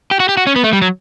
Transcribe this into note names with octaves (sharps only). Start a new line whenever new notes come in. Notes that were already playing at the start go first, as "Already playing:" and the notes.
G4
F#4
G4
F#4
C#4
B3
A3
G3
F#3